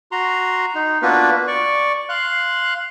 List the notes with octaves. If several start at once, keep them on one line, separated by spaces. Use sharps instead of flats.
F#4 A#5 C6
D#4
A#3 B3 D4 F4 F#4 B4
D5 C#6
F5 C6 F#6